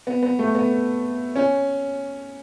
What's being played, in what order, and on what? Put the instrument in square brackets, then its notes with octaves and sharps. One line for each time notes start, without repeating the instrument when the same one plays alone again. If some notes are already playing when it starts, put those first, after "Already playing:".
[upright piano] B3
B3
A3
B3
C#4